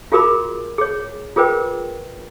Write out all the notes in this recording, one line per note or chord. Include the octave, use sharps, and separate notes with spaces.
F4 F#4 G#4 A#4 B5 D6
G#4 C#5
F4 G#4 A#4 B4 G5